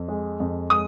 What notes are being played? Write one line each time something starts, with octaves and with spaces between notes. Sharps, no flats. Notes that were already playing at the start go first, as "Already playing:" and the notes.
Already playing: F2
G#3
F2
G#3 D#6